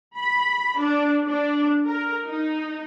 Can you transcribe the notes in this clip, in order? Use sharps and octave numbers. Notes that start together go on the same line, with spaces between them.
B5
D4
D4
A#4
D#4